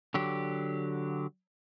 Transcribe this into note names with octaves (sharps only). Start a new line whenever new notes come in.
D3 F#3 G4